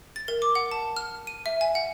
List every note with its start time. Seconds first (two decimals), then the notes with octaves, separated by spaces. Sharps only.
0.16 A6
0.28 A#4
0.42 D6
0.55 F#5
0.71 A5
0.96 F6
1.27 D#7
1.46 E5
1.61 G#5
1.75 F#5